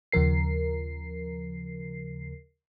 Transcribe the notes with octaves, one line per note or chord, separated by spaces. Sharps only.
D#2 C#3 F3 A#4 C7